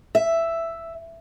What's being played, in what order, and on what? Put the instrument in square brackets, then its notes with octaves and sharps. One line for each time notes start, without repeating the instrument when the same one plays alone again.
[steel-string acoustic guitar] E5